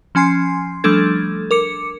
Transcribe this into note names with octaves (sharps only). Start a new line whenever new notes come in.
F3 C#4 G#5 C6 C7
F3 G3 A3 D4 A4 G#6
A#4 D6 C#7